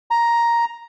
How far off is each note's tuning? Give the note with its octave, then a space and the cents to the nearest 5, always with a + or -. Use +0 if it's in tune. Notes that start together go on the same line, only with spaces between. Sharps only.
A#5 +5